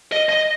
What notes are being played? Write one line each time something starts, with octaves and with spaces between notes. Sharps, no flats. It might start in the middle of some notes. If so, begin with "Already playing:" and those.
D#5
D#5